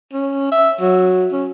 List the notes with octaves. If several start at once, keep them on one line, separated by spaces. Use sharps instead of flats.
C#4
E5
F#3
C#4